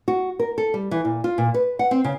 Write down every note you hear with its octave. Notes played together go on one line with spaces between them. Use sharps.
F#4
A#4
A4
G3
E3
A#2
F4
A#2
B4
F#5
C4
C#3